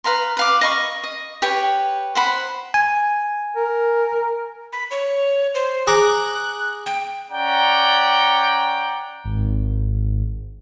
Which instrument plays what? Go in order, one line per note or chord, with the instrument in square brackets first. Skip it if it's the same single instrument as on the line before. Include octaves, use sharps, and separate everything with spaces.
[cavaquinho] B4 F5 A#5 C6
B4 F5 D6
D#5 F5 B5 C#6
D#5
G4 B4 C#5 G5
C5 F#5 B5
[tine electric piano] G#5
[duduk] A#4
[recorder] B5
C#5
C5
[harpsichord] G#4 A#5 D6 [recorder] F#6
[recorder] G5
[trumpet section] C#4 D5 F#5 G5 A#5
[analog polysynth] G#1